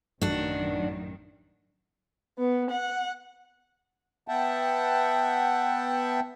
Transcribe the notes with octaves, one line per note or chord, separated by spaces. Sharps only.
A1 F#2 D#3 D4 F#4
B3
F#5
B3 E5 F#5 G5 A5